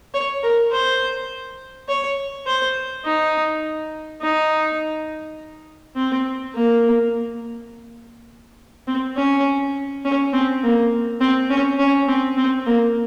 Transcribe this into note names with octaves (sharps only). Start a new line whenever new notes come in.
C#5
A#4
C5
C#5
C5
D#4
D#4
C4
A#3
C4
C#4
C#4
C4
A#3
C4
C#4
C#4
C4
C4
A#3